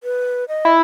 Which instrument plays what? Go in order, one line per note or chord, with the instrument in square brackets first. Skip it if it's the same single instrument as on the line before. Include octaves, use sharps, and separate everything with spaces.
[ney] B4
D#5
[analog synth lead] E4